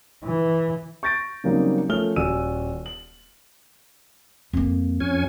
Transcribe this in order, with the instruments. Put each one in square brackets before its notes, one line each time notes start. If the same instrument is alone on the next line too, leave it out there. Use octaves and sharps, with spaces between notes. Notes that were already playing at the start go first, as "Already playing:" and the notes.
[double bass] E3
[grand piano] C#6 G6 A6 A#6 D7
C#3 F#3 G3 A#3 C4 D#4
F3 A3 C#4 A#4 F6 G7
D#1 F#4 D5 G#5 E6 D#7
F#7
[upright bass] F2 A#3
[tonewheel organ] F2 C#4 G#5